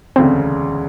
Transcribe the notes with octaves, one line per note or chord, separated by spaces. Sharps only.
E1 D2 C#3 C4